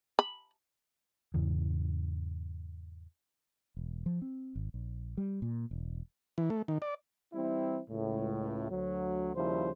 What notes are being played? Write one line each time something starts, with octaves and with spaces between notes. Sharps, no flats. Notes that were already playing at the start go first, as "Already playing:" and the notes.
B5
E2 G#2 C#3 E3
E1
F3
C4
G#1
A#1
G3
A#2
E1
E3
A3
D#3
D5
E3 G3 C4 E4
C#2 A2
D2 F#3
D#2 C#3 F3 G3 E4 C5